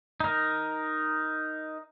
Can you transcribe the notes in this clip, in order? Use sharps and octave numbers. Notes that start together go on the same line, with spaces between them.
D#4 A#4